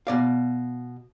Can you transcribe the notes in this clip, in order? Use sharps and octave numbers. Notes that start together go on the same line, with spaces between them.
B2 D5 F5